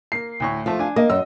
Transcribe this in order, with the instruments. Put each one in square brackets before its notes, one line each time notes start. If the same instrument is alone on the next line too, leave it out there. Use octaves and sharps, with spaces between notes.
[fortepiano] A#3 [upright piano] C7
[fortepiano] D2 A2 C#6
[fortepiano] F3 A3 [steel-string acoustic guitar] F4
[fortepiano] D4 G#5
[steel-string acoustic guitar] A#3 [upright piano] D#5
[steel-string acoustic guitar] F#2 [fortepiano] E6